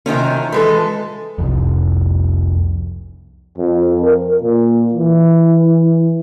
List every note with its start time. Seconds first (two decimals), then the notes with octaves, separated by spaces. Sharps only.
0.06 C3 D#3 F3 C#4
0.52 E3 G#3 A4
1.38 F1 C2 F2
3.58 F2
4.02 A#4
4.42 A#2
4.94 E3